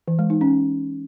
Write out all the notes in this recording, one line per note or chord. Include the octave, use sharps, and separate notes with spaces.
E3
G#3
D#4
C#4